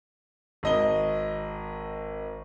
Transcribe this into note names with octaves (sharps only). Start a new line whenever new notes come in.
G#1 D#5 G7